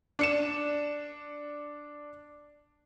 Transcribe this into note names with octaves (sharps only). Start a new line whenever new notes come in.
D4 C#7 E7